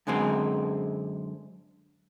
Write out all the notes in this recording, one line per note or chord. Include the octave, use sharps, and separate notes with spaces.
F#2 D3 G#3 C4